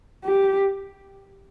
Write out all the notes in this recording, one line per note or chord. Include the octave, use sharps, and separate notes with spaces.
G4